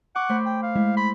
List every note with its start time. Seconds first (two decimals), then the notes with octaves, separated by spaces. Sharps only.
0.15 F#5 C#6 D6
0.29 A3 C5 B5
0.46 G5
0.63 F5
0.75 G#3 E4
0.97 B5 C6